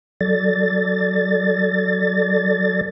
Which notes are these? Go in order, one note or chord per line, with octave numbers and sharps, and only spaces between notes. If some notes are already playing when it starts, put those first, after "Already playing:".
F#3 A4 D5 A6